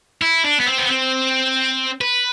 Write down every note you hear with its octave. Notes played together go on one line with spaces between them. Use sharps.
E4
D4
B3
C4
B3
C4
B4